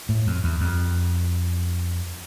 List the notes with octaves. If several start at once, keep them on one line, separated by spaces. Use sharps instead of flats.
A2
F2
E2
F2